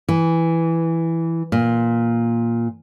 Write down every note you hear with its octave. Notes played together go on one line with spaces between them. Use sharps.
E3
A#2